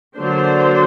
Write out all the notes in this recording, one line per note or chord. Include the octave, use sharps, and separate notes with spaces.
D3 F#3 A#3 D4 C5